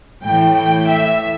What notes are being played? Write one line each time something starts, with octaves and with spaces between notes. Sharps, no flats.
A2 E3 G5
G5
E5